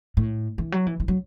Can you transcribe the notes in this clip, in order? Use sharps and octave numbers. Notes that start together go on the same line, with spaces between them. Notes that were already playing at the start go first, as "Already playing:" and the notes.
A2
E3
F#3
E3
E3
F#3